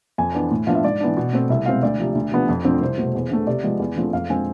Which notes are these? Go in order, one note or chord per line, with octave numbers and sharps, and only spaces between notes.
F2 G#5
E3 B3 D4
A2
F3 B3 D4 F5
E5
G#2 D5
E3 B3 D4
B2
A3 C4
C2 E5
B2 G#3 C4 F5
D2 D5
C3 F3
D2
C3 F3 B3 D4
F2
D3 F3 A3 C4
C2 C5
B2 A3
E2
D3 A3
C3 D5
F3 G#3 B3
E2
D3 F3 A3 C4
F2 F5
D3 F3 G#3 C4 G#5